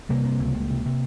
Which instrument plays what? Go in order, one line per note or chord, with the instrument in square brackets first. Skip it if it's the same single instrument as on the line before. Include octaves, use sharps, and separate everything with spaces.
[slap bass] C3 G3 A#3
C3
C#2
C#2
C3
C3